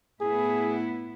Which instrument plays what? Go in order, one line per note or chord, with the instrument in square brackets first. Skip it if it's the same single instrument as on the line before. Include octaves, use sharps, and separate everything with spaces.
[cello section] A2 B3 E4 [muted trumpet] G#4